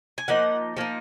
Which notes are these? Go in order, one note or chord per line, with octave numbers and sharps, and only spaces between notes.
G#5
F3 A#3 D#4 F#5
F3 A#3 D#4